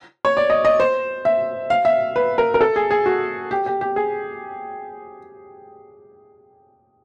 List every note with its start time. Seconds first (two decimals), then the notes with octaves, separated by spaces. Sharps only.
0.25 C#5
0.37 D5
0.50 D#5
0.65 D#5
0.80 C5
1.25 E5
1.70 F5
1.85 E5
2.16 B4
2.38 A#4
2.54 A#4
2.61 A4
2.76 G#4
2.91 G#4
3.06 F#4
3.51 G4
3.66 G4
3.81 G4
3.96 G#4